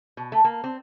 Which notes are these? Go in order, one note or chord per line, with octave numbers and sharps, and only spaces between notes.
B2
A3
A#3
C4